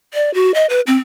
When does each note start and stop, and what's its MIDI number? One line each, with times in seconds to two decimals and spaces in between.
0.14 0.33 74
0.34 0.54 66
0.54 0.66 75
0.70 0.81 71
0.87 0.97 60